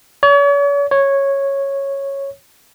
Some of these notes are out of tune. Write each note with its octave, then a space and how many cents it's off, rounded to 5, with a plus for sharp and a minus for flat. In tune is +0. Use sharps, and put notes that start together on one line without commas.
C#5 +40
C#5 -10